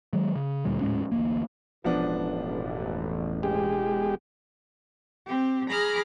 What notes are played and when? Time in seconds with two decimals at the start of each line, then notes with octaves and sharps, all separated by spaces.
0.13 D#3 F#3 G#3
0.36 C#3
0.65 D2 A#2 D3 G3
0.81 D#1 A2 G#3 C#4
1.12 D1 A1 A2 A#3
1.84 E1 A1 F3 B3 D4
3.43 G#3 G4
5.27 C4 G4
5.69 G#4 A#5 B5 D6 F6